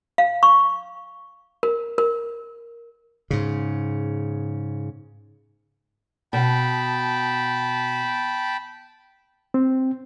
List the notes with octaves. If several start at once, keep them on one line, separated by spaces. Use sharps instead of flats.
F5
C#6
A#4
A#4
G#2 C#3
B2 G5 A5 B5
C4